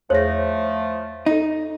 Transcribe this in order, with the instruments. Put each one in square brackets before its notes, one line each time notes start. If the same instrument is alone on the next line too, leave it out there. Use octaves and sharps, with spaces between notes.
[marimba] E2 G#4 A#6 [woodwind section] F3 A3 [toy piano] C5 C#5
[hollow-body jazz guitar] D#4 [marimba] A4 D#5